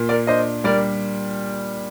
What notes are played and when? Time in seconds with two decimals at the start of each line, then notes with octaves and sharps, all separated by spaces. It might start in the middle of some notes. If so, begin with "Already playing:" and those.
Already playing: A#2
0.09 A#4 D5
0.27 D4 C5 D#5
0.64 G3 A#4 D5